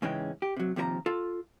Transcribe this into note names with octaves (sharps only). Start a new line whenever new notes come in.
G#2 C#3 E3 G#3 C#4 G5
G4
C3 F#3
D#2 C3 F3 A#4 A#5
F4 A4